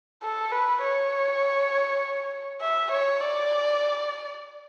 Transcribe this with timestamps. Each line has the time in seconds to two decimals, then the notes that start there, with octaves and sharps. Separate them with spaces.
0.23 A4
0.52 B4
0.83 C#5
2.61 E5
2.92 C#5
3.21 D5